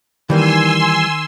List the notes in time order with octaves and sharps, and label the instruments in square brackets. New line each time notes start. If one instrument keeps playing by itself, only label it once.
[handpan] D#3 [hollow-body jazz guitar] E3 G3 A#3 [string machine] G#5 C6 E6